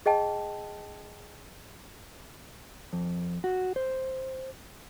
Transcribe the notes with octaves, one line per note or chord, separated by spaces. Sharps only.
G#4 D#5 G5 A5
F2
F#4
C5